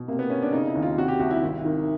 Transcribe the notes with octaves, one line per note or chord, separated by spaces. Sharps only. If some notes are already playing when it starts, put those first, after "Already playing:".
Already playing: B2
C3 A#3
B3
C3 C#4
D4
C#3 D#4
E4
D#2
F4
C3 F#4
G4
C2 F#4
E4
G#1
D#3